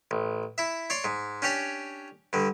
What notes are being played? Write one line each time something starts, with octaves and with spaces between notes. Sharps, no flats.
A1
E4 E5
C#5 D5 C6 C#6
G#2
C#4 D4 G4 C#5 D5
G2 D3